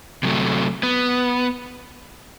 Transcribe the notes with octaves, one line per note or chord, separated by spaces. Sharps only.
C3 F#3 A3
B3